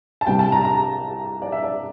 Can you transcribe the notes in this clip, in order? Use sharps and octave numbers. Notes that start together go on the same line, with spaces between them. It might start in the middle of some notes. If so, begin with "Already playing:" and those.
A5
C2 C3 G3 G5
A5
A#5
A#5
D5
E5
D5